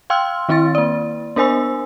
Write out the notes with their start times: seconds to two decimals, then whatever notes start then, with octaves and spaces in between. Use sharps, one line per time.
0.10 F5 G5 C6 E6 F6
0.49 D#3 C4 E4 C6 A6
0.75 A#3 D5
1.36 B3 D4 A#4 C5 G#5 E6